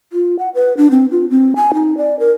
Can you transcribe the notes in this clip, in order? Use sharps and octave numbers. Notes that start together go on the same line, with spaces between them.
F4
F#5
B4
D4
C4
F4
C4
G#5
D#4
D5
A#4